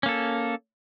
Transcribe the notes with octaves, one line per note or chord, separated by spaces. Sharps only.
A#3 C#4 A4